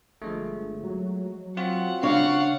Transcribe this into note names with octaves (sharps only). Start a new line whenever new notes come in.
G1 F3 G#3 A3
F#3
C4 F4 F#4 F#5
C#3 D4 C#5 F5 F#5